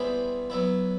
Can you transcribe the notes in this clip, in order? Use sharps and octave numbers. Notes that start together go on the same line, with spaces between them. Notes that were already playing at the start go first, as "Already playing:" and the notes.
Already playing: G3 B3 E4 G#4 C5
F#3 B3 E4